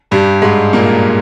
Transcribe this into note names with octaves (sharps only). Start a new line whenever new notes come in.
G2 G3
G#2 G#3
A#2 A#3